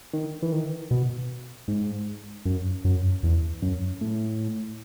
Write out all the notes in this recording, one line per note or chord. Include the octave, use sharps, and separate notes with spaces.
D#3
E3
D#3
B2
G#2
F#2
F#2
E2
F#2
A2